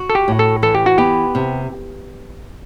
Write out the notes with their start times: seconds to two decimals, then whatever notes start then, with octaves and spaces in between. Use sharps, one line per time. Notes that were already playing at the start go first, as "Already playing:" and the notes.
Already playing: F#4
0.10 A4
0.15 G4
0.28 A2
0.39 A4
0.62 E3 A4
0.75 G4
0.86 F#4
0.98 B3 G4
1.35 C3